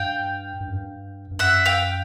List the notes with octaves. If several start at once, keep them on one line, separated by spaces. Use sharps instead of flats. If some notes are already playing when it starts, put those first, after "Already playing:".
Already playing: G2 F5 G5
G2
F#2
G2
G2
F#2 E5 F#5
F5 G5